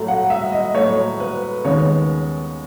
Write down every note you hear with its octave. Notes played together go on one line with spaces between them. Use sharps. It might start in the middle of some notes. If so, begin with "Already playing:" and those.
Already playing: A2 F#3 A3
F#5
E5
D#5
A2 F#3 A3 C#5
B4
D#2 C#3 G#3 B3 C#5